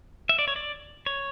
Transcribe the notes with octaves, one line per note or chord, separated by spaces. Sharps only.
E5
D5
C#5
D5
C#5